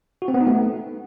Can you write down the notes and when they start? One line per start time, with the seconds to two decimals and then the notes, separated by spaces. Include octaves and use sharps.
0.22 F#4
0.28 C4
0.34 B3
0.41 D#4
0.47 A3